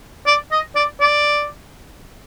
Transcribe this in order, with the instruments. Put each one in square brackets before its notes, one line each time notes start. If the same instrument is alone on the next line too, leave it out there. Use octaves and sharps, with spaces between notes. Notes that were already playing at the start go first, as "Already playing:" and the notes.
[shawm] D5
D#5
D5
D5